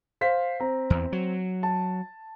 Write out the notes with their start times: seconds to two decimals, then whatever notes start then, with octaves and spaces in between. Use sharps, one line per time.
0.21 C5 F5 B6
0.60 C4 A#5
0.90 E2
1.12 F#3
1.63 A5